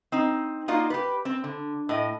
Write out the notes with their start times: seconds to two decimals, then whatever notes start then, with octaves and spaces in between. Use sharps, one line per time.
0.12 C4 D#4
0.68 A#3 D#4 F4 F#4 D5
0.90 G4 B4
1.25 C4
1.44 D3
1.89 A2 D#5